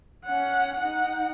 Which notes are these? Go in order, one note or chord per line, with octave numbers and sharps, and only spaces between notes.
C#4 F#5
D#4 F#5